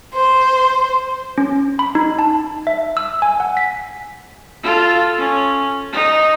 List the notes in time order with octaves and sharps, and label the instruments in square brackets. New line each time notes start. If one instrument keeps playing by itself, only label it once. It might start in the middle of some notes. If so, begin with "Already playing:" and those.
[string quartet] C5
[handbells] C#4
B5
D#4
A5
E5
E6
G#5
F#5
B6
[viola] F4 A4
C#4
D#4